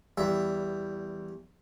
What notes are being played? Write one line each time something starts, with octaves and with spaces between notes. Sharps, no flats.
E2 G3 E5